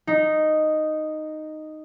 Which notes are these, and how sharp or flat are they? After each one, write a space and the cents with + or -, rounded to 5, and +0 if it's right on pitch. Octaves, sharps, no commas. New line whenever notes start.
D#4 -5